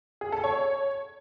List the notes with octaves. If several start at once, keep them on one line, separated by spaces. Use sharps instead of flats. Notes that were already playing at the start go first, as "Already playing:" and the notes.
G#4
A4
C#5